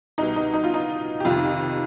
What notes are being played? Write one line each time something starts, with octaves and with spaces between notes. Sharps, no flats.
C2 B2 D#4
D#4
D#4
F4
D#4
G4
F2 C3 D#3 F4